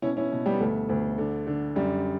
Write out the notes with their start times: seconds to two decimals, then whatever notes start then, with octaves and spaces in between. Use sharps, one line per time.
0.02 B2 C#4 E4
0.17 C#4 E4
0.32 B2
0.46 G3 B3
0.60 D2 A3
0.89 D2
1.18 D3
1.47 D3
1.76 F#2 G3